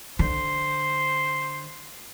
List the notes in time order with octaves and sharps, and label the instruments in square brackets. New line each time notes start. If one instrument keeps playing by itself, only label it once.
[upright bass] D3 [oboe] C5